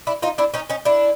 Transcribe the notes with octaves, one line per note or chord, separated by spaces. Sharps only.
D4 E4
D#4 F4
D4 E4
C#4 D#4
C#4 D#4
D4 E4